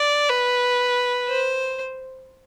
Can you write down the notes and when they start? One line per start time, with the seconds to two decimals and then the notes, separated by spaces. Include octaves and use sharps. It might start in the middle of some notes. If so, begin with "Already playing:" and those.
Already playing: D5
0.29 B4
1.28 C5